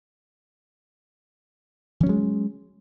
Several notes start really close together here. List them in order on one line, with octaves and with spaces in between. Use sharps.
E3 C#4 F#3 G#3